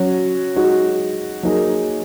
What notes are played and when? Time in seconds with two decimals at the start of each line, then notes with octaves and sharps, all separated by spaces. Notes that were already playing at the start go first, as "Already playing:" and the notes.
Already playing: F#3 C#4 F#4
0.55 G#3 D#4 F#4
1.43 F#3 A#3 D#4 G#4